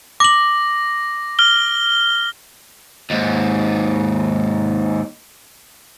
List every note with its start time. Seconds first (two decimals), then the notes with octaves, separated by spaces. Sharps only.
0.20 D6 A#6 F#7
1.39 F6 G7
3.10 D#2 G#2